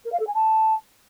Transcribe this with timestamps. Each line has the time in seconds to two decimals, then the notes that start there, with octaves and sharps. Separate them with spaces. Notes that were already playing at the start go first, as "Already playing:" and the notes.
0.04 A#4
0.12 F5
0.19 A4
0.27 G#5
0.34 A5